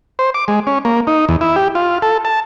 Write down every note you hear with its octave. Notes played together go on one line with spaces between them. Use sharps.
C5
D6
G#3
C#4
A#3
D#4
E2
E4
G4
F4
A4
A5